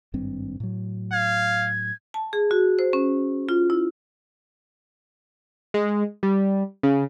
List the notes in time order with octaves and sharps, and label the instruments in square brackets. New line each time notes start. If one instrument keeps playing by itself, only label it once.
[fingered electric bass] G#1 G2 C4
A2 F#3
[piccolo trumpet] F5 [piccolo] G#6
[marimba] A5
G#4
F#4
C5
C#4
F4
E4
[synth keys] G#3
G3
C#3